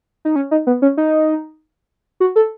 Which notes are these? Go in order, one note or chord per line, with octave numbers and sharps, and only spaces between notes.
D#4
C#4
D#4
B3
C#4
D#4
F#4
A4